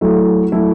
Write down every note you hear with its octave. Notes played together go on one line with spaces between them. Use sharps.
F#3 A3 E4 A4
F#3 A3 E4 A4